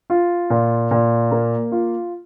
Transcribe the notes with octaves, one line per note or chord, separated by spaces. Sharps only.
F4
A#2
A#2
A#3
F4